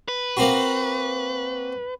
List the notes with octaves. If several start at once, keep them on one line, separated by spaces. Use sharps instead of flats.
B4
A#3 C4 F#4